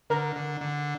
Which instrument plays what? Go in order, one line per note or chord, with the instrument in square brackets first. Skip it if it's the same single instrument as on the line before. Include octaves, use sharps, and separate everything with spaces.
[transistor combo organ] D3 [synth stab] A#4
[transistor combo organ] D3
D3